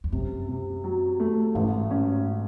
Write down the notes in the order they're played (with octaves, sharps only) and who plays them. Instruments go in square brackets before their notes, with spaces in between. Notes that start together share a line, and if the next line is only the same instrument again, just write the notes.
[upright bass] E2
[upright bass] F#2 [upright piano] C3
[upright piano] C3
F#3
A3
[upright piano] A1 [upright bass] G#2
[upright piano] C#4